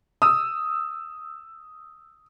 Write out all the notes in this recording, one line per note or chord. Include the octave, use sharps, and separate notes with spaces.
D#6 E6